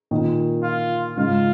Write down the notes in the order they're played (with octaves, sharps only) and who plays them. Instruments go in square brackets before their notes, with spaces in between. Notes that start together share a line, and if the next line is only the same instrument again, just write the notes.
[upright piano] A#2 D#3
[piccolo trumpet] F4
[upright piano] G#2 C#3 [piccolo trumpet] F4